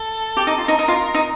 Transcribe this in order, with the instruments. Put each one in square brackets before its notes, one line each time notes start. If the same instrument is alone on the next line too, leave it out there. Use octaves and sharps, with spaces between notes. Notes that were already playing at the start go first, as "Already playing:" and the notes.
Already playing: [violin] A4
[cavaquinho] G4
D#4
F4
[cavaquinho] D#4 [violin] A#4
[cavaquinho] D#4
F4
D#4